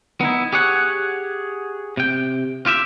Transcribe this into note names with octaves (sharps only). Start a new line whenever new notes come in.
B3 D#4 E4
G4 G#4 C#5 F#5
C3 G5
F4 G4 E5